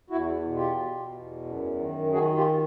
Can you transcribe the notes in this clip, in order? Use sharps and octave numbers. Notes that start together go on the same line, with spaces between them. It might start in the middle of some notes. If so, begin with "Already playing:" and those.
E2 E4 F#4
B2
F4 G4
B2
E2
F#2
D#3
D#3 F#4 G#4
F4 G4